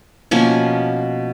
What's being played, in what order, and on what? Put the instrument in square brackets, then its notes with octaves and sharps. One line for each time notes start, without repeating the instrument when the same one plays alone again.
[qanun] B2 F3 A#3 C#4